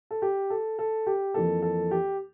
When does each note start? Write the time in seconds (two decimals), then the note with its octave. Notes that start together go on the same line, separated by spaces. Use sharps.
0.11 A4
0.22 G4
0.50 A4
0.79 A4
1.07 G4
1.34 F2 E3 A#3 A4
1.62 A4
1.91 G4